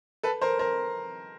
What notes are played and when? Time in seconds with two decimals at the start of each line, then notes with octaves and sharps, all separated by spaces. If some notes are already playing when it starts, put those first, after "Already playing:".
0.23 A4 B4
0.42 A#4 C5
0.59 A#4 C5